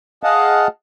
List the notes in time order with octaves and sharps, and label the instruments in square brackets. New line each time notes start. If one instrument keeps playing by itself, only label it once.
[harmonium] G#4 D#5 F5 F#5 A5